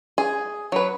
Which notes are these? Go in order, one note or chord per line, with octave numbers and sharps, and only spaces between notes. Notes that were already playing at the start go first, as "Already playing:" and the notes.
G#4
F#3 B4